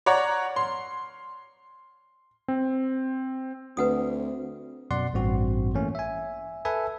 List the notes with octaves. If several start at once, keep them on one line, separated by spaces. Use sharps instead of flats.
C#5 D5 F#5 A#5
C6
C4
D2 C4 B4 F#5 D#6
F#2 B2 D5 F#5 C6
A1 G2 C4 F#4
E3 A3 A#3 C#4
E5 G#5
A4 B4 E5 G#5